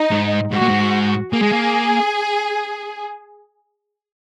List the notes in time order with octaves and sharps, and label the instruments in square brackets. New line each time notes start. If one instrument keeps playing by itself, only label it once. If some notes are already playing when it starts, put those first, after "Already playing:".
Already playing: [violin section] D#4
[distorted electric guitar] G#2
[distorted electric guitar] G#2 [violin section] F#4
[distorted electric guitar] A#2
G#2
[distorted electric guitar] A#3 [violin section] G#4
[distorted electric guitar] G#3
A#3